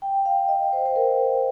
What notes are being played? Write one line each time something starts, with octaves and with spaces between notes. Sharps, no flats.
G5
F5
D#5
C5
C5
A#4